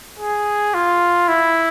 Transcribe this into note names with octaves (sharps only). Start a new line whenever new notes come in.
G#4
F4
E4